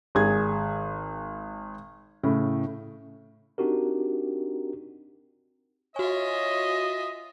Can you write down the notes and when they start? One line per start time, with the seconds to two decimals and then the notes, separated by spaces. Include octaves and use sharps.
0.15 G#1 G#4 G#6
2.23 A2 C#3
3.58 C4 D4 D#4 F#4 G4 A#4
5.96 F4 F#4 C#5 D#5 E5 G#5